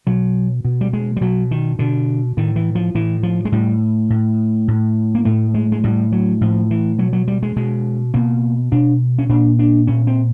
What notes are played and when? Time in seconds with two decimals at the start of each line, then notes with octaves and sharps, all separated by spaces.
0.07 B2 F#3
0.65 B2
0.81 G3
0.93 G#3
1.16 G3
1.21 B2 F#3
1.51 D#3
1.79 B2 D3
2.37 A2 D#3
2.56 E3
2.75 F3
2.95 A2 E3
3.23 F3
3.45 G#3
3.52 A2 G3
4.10 A2
4.68 A2
5.15 A#3
5.25 A2 A3
5.54 G#3
5.72 G#3
5.84 A2 G3
6.12 F#3
6.41 A2 F3
6.71 E3
6.98 B2 F#3
7.13 F#3
7.28 G3
7.43 G#3
7.56 B2 G#3
8.14 B2 A#3
8.72 B2 D4
9.19 C#4
9.29 A#2 D4
9.59 D4
9.87 A#2 C#4
10.07 C4